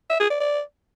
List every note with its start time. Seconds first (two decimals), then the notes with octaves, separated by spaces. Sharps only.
0.10 E5
0.20 G#4
0.30 D5
0.40 D5